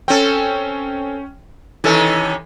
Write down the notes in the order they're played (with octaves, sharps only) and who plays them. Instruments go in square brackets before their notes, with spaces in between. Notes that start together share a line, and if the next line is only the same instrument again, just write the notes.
[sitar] C4 A4 [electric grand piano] C#4 G5
[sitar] C3 D#3 C#4 [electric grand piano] E3 A4